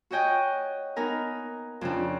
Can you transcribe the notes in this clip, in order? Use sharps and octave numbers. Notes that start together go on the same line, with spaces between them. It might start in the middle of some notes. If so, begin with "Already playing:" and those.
F#4 C#5 D#5 G5 G#5 F#6
B3 D#4 A#4 G#5
F2 C#3 D4